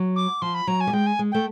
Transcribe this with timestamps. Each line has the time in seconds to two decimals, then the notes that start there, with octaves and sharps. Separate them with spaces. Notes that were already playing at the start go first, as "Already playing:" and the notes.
Already playing: F#3
0.16 D6
0.42 F3 C6
0.54 B5
0.67 F#3 A#5
0.80 G#5
0.87 G3
0.93 G#3 G5
1.06 G#5
1.19 G#3
1.31 A3 G5